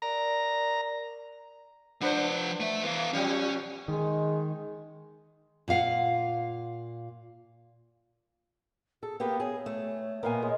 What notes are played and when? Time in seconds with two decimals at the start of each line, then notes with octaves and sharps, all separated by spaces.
0.02 A#4 D5 A#5
2.01 F3 D4 B4 C5 F#5
2.60 A3 E5
2.83 E3 B3 F5
3.13 B2 F3 G3 C#4
3.88 D#3 G#3
5.68 A#2 F4 F5 F#5
9.03 G#4 A4
9.20 A#3 B3 G4 A#4
9.40 G#4 C#5
9.66 A3
10.23 A#2 A#3 B3 A#4 F5 G#5
10.42 G#3 C#5